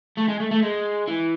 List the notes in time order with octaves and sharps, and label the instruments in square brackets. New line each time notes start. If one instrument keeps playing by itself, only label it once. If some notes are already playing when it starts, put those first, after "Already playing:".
[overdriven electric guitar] A3
G#3
A3
A3
G#3
E3